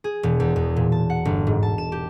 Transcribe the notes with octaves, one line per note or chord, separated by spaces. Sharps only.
G#4
E1
E2
E2
A#2
A5
F#5
G1
G#2
A5
E7
G4